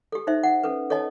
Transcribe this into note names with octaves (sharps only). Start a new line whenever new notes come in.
G4 A4
D#4 C5 E5
F#5
C#4 A4 B4
A4 C#5 D#5 A5